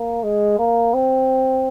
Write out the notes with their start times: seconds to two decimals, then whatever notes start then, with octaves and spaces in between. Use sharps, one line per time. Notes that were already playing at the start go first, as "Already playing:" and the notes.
Already playing: A#3
0.24 G#3
0.59 A#3
0.94 C4